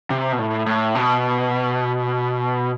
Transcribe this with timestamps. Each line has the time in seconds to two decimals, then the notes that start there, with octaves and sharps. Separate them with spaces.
0.10 C3
0.32 B2
0.39 A2
0.66 A2
0.95 B2